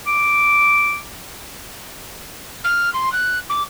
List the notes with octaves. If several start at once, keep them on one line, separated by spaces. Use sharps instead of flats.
D6
F6
C6
F#6
D6